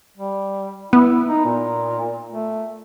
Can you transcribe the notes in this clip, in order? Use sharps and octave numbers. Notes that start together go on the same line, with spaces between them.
G3
B3 E4
D#4
A#2
A3